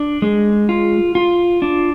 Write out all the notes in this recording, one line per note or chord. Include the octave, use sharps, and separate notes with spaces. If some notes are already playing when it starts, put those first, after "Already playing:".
Already playing: D4
G#3
F4
F4
D4